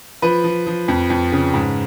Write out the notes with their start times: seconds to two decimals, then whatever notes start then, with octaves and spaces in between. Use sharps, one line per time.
0.22 F3 B4
0.44 F3
0.67 F3
0.88 F2
1.10 F2
1.32 C#3
1.54 G#2